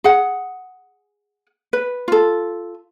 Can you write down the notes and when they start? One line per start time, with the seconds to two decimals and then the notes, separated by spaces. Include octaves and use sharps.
0.04 G#4 F#5
1.73 B4
2.08 F4 A4